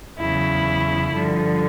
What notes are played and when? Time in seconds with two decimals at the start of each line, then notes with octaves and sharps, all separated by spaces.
0.17 E2 C#3 F#3 E4
1.12 G2 D3 F3